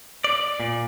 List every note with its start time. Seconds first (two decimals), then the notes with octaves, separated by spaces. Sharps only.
0.24 D5
0.60 A#2